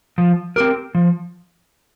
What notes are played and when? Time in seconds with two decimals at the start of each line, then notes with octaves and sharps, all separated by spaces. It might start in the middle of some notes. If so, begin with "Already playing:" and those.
0.18 F3
0.56 C4 G4 A#4
0.95 F3